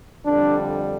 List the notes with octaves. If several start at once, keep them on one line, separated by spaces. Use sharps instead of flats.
F2 D3 G3 D4